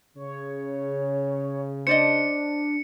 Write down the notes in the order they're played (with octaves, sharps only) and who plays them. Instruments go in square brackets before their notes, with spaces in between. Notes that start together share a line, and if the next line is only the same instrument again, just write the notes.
[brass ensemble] C#3 [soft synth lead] C#5
[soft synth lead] D4 [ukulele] C5 D5 D#5 [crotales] C#7